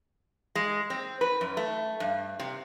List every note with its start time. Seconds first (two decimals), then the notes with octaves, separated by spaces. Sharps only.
0.55 G#3
0.90 C4
1.21 B4
1.41 F#2
1.57 A3
2.00 G2
2.39 C3